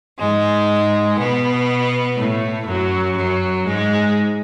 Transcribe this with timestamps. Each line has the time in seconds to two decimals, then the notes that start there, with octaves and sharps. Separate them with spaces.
0.19 G#2 G#3
1.18 B2 B3
2.17 A2 A3
2.66 F#2 F#3
3.15 F#2 F#3
3.65 G#2 G#3